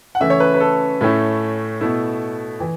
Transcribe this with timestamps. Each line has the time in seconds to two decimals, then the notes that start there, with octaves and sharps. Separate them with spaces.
0.15 F#5
0.20 C#3 E3 A3 E5
0.30 C#5
0.40 B4
0.54 B4
0.60 A4
1.01 A2 A3 C#4 E4
1.81 B2 A3 E4
2.60 E3